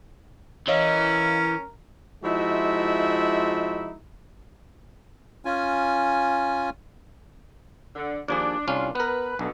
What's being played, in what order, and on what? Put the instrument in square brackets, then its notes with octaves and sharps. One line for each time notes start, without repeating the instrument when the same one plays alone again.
[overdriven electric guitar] E3 [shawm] C#4 [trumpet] A#4 [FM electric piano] C#5 D#5 F5
[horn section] F3 G#3 D#4 E4 F#4 E5
[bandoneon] C#4 F4 G#5
[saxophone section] D3
[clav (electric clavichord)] D#2 F3 G#4 [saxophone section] D4
[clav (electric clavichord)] C2 C#4 [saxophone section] D4 F4
[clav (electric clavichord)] B3 A#4 [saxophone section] B4
[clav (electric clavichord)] B1 [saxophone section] G2 B2 D3